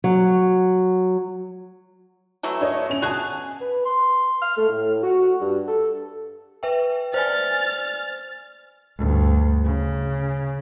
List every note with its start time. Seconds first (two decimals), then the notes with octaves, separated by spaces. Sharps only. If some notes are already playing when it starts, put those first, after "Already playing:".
0.04 F#3
2.43 E3 F#3 A3
2.61 D4 C#5 D#5
2.90 C#4 F7
3.02 F#4 G#4 G#5 A5 F#6
3.61 B4
3.86 C6
4.42 F6
4.57 A3
4.69 A2
5.03 F#4
5.41 G2
5.68 A4
6.63 B4 E5 G5
7.14 C5 D5 G#5 F6 A6
8.98 D2 G2
9.64 C#3